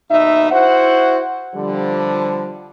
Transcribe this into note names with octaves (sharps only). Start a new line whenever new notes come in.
D#2 B2 D#4 E5
E4 F#4 C5 F#5
D3 F3 G3